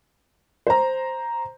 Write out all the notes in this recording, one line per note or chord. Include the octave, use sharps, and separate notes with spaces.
C5 A#5